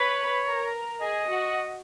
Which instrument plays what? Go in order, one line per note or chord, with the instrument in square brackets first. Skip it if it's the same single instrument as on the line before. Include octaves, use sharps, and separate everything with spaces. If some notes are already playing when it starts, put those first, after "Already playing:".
Already playing: [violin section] B4 B5 [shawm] C#5
[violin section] A#4 A#5
[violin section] G#4 G#5 [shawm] D#5
[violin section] F#4 F#5